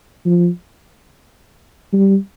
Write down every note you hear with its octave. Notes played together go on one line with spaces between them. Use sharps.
F3
G3